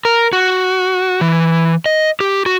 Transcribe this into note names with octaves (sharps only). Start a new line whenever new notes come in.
A#4
F#4
E3
D#5
G4
F#4